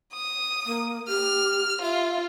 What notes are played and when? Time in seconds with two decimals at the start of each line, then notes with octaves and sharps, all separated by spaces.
0.13 D#6
0.66 A#3
1.08 G4 F6
1.82 F4 E5